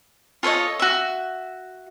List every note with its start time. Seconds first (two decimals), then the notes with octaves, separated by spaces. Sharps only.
0.43 F4 A4 C#5 D#5
0.79 F#4 E5